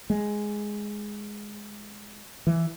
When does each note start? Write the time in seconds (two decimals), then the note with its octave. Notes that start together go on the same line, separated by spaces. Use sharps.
0.10 G#3
2.47 E3